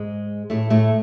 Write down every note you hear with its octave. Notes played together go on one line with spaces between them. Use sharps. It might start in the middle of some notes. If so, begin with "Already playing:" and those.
Already playing: G#2 G#3
A2 A3
A2 A3